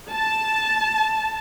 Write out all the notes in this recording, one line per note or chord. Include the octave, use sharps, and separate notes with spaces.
A5